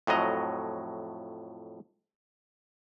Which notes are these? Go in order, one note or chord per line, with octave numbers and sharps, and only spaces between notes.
F2 A2 F#3 D#5 A#5